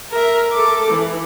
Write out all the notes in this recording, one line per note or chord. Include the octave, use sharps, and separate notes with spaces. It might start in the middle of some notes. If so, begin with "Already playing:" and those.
A#4 E5
A4 D6
E3